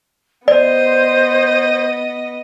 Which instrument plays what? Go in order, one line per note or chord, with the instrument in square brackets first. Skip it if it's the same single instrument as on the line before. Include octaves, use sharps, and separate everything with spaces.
[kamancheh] B3 D#5 [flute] C5 [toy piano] D5